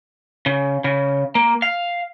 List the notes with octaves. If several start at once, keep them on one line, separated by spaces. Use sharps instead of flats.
C#3
C#3
A#3
F5